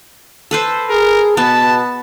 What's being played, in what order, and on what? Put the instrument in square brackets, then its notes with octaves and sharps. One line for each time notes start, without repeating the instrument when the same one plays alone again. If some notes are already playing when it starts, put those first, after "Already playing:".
[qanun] A4 B4 C5
[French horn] G#4 [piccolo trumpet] A#4
[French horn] B2 [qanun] B3 [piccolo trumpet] A5